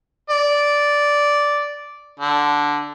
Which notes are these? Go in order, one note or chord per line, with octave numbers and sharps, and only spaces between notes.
D5
D3